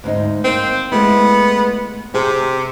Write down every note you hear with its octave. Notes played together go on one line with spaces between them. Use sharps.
D2 G#2 D#4
D#3 A#3 C4
G#3 A3 B3 E4
C3 G#4